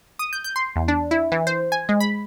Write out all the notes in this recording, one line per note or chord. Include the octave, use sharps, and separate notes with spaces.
D#6
G6
G6
C6
E2
D4
E4
E3
C5
G#5
G#3
B5